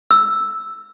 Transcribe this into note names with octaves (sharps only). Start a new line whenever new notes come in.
E6